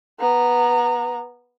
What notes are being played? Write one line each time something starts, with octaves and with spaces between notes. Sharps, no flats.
B3 A#5